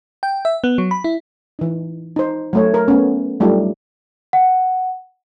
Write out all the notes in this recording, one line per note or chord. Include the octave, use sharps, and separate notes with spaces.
G5
E5
B3
F#3
B5
E4
E3 D#4
D#4 C5
F#3 A3 C#5
A#4
A3 B3 C#4
F#3 G3 A3 D#4 F4
F#5